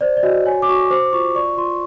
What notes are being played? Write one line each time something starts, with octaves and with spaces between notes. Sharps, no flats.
C5 D5
D5
F#4 D#5
C#5 G#5
D6
F#4 C#6
C5 D6
F4 C#6
D5 C#6
F4 C6